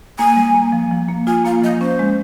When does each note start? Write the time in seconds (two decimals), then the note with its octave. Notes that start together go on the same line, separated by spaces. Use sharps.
0.19 A#3 G#5
0.36 G3
0.55 A#3
0.72 F3
0.91 F3
1.09 A#3
1.27 F4 G#5
1.45 A#3 F5
1.62 F3 D#5
1.81 C#4 C5
1.99 G#3